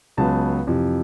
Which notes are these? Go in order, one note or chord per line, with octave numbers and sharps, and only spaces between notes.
C#2 C#3 F#3 B3 A5
F2 C3 E3